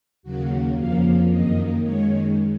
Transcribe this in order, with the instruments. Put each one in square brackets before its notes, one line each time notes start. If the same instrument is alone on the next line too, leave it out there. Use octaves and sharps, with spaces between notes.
[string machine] D#2 C#3 F#3 A#3 F#4
F2 C#3 F3 A#3 F5
F#2 D#3 A#3 D#5
F#2 D#3 G#3 C#5